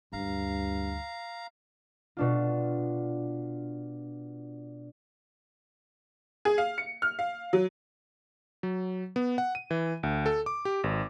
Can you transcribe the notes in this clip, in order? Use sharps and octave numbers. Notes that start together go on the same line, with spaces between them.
D2 G2 F5 A#5
B2 D4 F4
G#4
F5
C#7
F6
F5
F#3
F#3
B3
F#5
D#7
E3
D2
A4
D6
G4
G#1